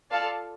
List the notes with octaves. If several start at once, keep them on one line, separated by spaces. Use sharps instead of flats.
F4 A4 D5 F5 A5